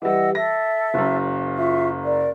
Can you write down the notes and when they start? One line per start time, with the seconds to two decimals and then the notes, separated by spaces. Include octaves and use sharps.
0.02 E3 G3 D#5 F#5 E6
0.35 A4 E5 A#6
0.94 F#1 F#2
1.56 F4 E5 C#6
2.02 A#4 D5